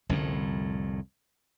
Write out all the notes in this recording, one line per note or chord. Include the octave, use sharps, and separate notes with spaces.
C2 F2 A2 D3 G3 C#4